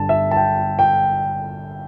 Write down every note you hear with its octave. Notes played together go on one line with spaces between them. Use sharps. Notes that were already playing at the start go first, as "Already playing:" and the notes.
Already playing: G1 G2 D3 A5
E5
A5
G5
G5